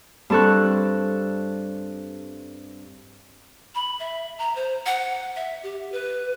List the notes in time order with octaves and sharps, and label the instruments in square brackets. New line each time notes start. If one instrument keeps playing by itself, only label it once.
[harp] G2 C4 A4 C#6 F#6
[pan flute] B5
E5
A#5
C5
F#5
E5
G4
B4